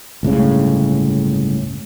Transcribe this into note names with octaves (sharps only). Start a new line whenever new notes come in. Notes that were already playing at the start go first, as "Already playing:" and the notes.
G1 C#2 A2 C#3